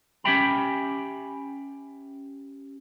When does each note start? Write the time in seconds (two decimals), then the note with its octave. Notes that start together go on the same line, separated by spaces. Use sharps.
0.24 C#4 G4 E5 G5 B5